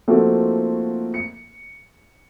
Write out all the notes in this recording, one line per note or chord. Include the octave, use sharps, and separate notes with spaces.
F3 A3 A#3 C4 D#4 F#4
C#7